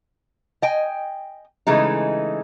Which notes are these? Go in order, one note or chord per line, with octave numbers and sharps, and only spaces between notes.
D#5 G5 G#5
C#3 E3 G#3 A3 D#4